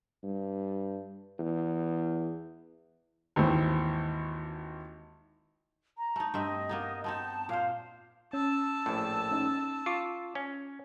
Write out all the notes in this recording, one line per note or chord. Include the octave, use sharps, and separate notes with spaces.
G2
E2
G#1 D#2 E3 C5
A#5
A3 D#4
G2 C4 D#5 E5
A#3 B3 D#4
B3 C4 D#4 A5
A#2 C5 F5
C#4 A5 E6
A#1 A2
C#4 D#4
F4 C#6 D6
C#4